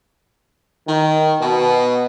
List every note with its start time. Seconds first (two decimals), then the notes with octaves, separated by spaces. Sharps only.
0.87 D#3
1.41 B2